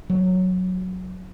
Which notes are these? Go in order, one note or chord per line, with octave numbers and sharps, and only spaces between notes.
F#3